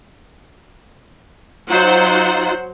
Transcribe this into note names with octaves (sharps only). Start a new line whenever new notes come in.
F#3 D#4 F4 C5 F#5 F#6